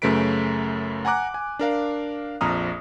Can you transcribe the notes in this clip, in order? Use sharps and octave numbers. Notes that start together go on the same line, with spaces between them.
F#2 C#3 A3 B4 B6 D7
F#5 G#5 A#5 D6 F#6
G#5
D4 A#4 F5
A#1 F2 A#5 D#6 F6